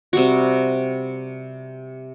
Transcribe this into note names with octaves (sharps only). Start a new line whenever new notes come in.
C3 G3 F#4